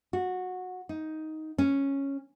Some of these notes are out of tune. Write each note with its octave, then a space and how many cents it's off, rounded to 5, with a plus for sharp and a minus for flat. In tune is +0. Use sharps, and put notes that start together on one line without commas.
F#4 -15
D#4 +10
C#4 -5